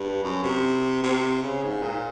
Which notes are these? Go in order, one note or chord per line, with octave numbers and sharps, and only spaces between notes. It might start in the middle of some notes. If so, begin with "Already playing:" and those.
Already playing: G2
F#2
C3
C3
C#3
G#2
A#2